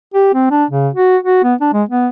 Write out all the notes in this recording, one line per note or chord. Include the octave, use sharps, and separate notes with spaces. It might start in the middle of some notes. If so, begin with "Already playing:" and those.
G4
C4
D4
C#3
F#4
F#4
B3
D4
G#3
B3